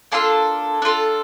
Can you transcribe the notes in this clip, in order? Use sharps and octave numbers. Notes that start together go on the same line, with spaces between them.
A#3 D4 F4 A4 A5 C6
D4 F4 A4